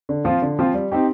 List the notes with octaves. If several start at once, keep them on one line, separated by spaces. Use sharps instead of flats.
D3
F3 C4 F4
D3
F3 C4 F4
G3
C4 D#4 G4